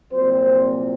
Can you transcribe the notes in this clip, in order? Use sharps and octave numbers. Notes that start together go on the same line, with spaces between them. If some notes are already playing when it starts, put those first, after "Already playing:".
C2 A#2 F#3 C4 C5